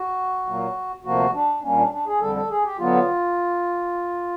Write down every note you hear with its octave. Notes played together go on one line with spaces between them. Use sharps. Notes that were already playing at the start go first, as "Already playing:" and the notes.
Already playing: F#4
A#2 F#3 A#3
D2 C3 F3 A#3 F#4
D4
A#2 G3 A#3 C#4
D4
D4
G#4
F2 D3 G3 A4
A4
G#4
G4
D3 F#3 B3 F4